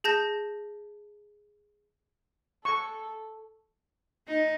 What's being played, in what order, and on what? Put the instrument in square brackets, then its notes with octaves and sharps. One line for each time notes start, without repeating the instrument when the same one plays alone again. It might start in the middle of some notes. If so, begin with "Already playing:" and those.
[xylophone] G#4 A5 G6 A#6
[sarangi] A4 [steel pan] C#6
[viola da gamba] D#4